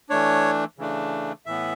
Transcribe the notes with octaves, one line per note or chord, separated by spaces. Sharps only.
E3 A3 D4 C#5
C#3 E3 A3 D4
A2 E3 B3 E5